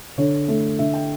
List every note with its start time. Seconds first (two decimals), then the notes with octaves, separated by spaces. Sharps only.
0.18 D3 C#5
0.48 A3
0.79 D3 E5
0.94 G5